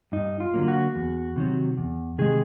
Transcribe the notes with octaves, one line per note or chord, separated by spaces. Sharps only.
G2 D#4
F4
D3 F#3 A#3
F#4
E2
C3 D#3 F#3
E2
C3 D#3 G#3 G#4